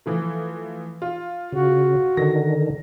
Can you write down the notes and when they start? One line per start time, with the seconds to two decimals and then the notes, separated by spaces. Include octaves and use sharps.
0.06 E3 F3 A3
1.02 F4
1.52 C#3 F#4
2.17 D3 D#3 A#6